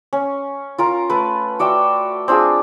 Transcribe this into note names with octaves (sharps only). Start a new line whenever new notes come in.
C#4
F4 A#4 A#5
A3 B4
F#4 D5 E5 G5
C4 D4 F4 G#4